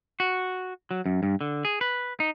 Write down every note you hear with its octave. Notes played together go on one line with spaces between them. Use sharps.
F#4
F#3
F#2
G2
D3
G#4
B4
D#4